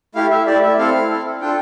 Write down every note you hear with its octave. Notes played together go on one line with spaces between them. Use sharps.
A3 E4 G4 F5
E5
A3 E4 G4 D5
E5
C4 E4 A4 F5
C4 E4 A4
D4 F4 A4 G5